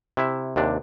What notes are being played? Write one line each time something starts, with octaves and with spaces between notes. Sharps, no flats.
C3 E4 E5
D#2 C3 D4